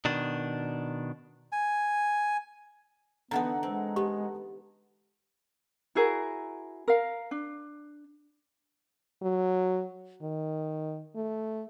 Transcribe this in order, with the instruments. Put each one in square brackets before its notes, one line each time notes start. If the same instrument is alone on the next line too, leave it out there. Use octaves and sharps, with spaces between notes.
[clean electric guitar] B2 D#3 D4
[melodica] G#5
[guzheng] D3 E3 D#4 [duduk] B3 [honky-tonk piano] A4 F#5 A#5
[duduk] G#3 [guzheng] C4
[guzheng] B3 [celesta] G4
[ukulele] E4 F#4 G#4 A#4
A#4 F5
D4
[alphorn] F#3
D#3
A3